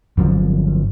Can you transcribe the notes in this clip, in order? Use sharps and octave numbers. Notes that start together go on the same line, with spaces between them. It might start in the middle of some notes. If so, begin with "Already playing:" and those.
G1 F3 F#3